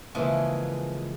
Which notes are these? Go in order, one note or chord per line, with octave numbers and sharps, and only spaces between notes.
C#3 E3 F3 G#3 A#3